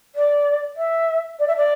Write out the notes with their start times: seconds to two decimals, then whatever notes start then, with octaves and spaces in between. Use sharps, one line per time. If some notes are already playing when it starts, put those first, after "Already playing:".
0.15 D5
0.76 E5
1.39 D5
1.48 E5
1.56 D5